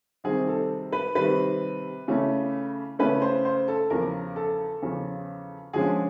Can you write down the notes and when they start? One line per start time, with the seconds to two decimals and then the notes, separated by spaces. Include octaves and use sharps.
0.24 C3 D#3 G3 C4 G#4
0.48 A4
0.92 B4
1.15 C3 D#3 G3 C4 B4
2.08 C#3 E3 A3 C#4
2.99 C#3 E3 A3 C#4 B4
3.22 C5
3.45 C5
3.68 A4
3.90 E2 C#3 F3 A#4
4.36 A4
4.82 E2 C#3 F3
5.73 D3 F3 G#3 C#4 G#4